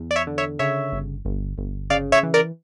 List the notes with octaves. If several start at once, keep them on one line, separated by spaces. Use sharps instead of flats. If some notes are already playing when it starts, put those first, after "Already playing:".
Already playing: E2
D5
C#5 E5
D3
C#5 E5
C#3 C#5 E5
G1
G1
G1
C#3 D5 F5
C#5 E5
E3
A#4 D5